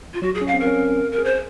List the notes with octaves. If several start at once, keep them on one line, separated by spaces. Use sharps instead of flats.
F4
F#3 F#4
G#4
C#4
F5
C4
A#4
C#4
A#4
G#4
C5